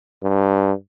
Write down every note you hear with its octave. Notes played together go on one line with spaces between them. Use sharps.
G2